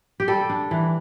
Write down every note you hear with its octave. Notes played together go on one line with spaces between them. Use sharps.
G4
G3 A4
D4
E3